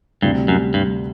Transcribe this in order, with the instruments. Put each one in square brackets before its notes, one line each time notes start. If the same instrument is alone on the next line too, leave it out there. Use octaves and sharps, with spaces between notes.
[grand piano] D2 C3 G3 [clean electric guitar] G2
[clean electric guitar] F#2
G2